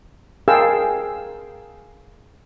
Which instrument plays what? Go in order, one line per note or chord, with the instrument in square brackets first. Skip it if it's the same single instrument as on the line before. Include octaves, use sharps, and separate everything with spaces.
[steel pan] G#4 A#4 F5 G5 A5 E6